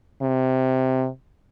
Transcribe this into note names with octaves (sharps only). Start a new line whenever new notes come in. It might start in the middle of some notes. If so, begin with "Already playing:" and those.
C3